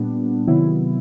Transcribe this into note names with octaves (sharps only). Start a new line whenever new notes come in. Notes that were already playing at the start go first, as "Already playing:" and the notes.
Already playing: A#2 G3 B3 D4
C3 D#3 F#3 B3 E4